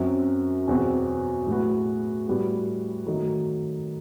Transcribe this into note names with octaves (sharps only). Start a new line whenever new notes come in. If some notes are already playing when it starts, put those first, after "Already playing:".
Already playing: F#2 F#3 C4 F#4
E2 B2 F#3 C4 F#4
A2 F#3 B3 F#4
A2 G3 B3 F#4
D#3 F#3 A3 D#4